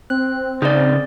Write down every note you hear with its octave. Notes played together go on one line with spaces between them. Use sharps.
C4 F#6
C#3 D#4 G#4 D5